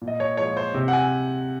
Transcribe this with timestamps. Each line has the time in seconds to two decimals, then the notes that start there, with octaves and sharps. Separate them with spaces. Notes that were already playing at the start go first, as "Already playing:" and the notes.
0.02 A#2
0.08 D#5
0.20 C#5
0.37 F3 G#3 C#5
0.57 C5
0.74 C3
0.88 F#5
0.93 G#5